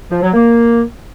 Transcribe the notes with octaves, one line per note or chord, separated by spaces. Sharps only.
F3
F#3
A#3